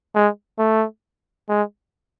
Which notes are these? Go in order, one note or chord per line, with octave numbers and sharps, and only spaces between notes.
G#3
A3
G#3